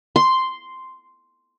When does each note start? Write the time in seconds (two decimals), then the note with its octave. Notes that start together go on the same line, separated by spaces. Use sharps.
0.16 C6